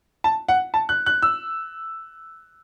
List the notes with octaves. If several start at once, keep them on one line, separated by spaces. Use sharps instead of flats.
A5
F#5
A5
F#6
F#6
E6